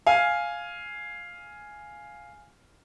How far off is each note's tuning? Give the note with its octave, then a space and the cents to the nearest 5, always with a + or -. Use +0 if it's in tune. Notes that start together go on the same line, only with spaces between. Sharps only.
F5 +0 G#5 +0